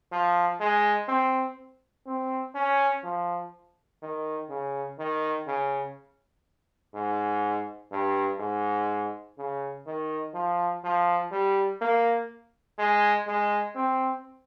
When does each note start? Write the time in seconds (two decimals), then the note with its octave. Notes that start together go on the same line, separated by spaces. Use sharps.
0.12 F3
0.60 G#3
1.08 C4
2.06 C4
2.55 C#4
3.04 F3
4.02 D#3
4.49 C#3
4.99 D#3
5.47 C#3
6.94 G#2
7.92 G2
8.39 G#2
9.38 C#3
9.86 D#3
10.34 F3
10.84 F3
11.32 G3
11.81 A#3
12.78 G#3
13.27 G#3
13.75 C4